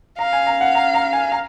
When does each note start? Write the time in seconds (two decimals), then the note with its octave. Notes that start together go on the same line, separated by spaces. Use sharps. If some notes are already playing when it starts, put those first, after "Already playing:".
0.19 F5 A#5
0.33 G#5
0.47 A#5
0.61 F#5
0.75 A#5
0.94 A#5
1.13 G#5
1.32 A#5